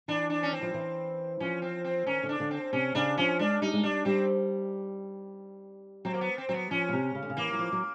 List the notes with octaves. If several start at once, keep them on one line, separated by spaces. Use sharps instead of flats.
E3 D4
D4
C#4
C4
F3
E3
F3 C#4
C4
C4
D#3 C#4
D3
D4
D3
C4
C3 C#4
C#3 D4
F3 C#4
G#3 D4
G3 D#4
G#3
G3 D4
G3 C4
F#3 C4
A#3
B3
C4
F#3 C4
B3
F3 C#4
B2
C3
C#3
D3
C#3
E3 A#3
F#3
F3
F#3